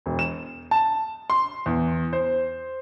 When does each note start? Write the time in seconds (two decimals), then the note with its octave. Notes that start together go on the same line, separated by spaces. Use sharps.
0.06 E1
0.19 E7
0.71 A5
1.30 C6
1.66 E2
2.13 C5